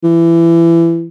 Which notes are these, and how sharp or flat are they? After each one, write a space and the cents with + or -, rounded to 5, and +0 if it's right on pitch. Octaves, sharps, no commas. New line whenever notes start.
E3 +25